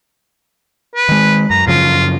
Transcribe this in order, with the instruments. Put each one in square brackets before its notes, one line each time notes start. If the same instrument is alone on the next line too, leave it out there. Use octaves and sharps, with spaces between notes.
[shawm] B4
[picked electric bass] D#3 G#3
[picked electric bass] F#2 [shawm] A#5
[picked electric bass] F#2 C#3 F3 [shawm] F4